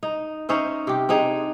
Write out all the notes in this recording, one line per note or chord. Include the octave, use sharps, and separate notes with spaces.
D#4
C#4 D#4 C5 E5
C3 G4
C4 D4 D#4 G#4